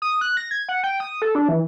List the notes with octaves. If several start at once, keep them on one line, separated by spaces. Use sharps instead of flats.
D#6
F#6
A#6
G#6
F#5
G5
D#6
A4
D4
E3